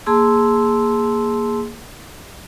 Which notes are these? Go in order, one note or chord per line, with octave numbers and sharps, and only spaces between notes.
A#3 G#4 A5 C6 E6